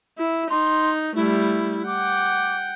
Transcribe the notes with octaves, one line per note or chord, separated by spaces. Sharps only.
E4
D#4 C6
G3 A3 E4
F#5 G5 D6